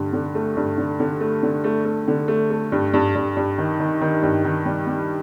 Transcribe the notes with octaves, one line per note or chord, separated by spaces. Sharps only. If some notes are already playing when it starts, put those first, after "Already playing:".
Already playing: G2 D3 A3
D3
A3
G2
D3
D3
A3
D3
A3
A3
D3
A3
A3
G2
G2
G2
G2
D#3
D#3
D#3
G2
D#3
G3
G3